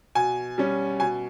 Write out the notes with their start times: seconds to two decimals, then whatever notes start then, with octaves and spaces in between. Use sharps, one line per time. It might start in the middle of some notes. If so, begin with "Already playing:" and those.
0.15 B2 G#5
0.58 G3 C#4
1.00 B2 G#5